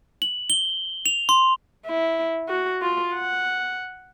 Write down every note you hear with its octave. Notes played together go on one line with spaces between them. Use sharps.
F#7
G7
F7
C6
E4
F#4
F4
F#5